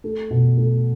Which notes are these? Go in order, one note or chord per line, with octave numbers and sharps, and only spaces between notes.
A3
B2
A3